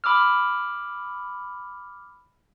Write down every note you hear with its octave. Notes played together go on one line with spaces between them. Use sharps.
B5 D6 E6 F6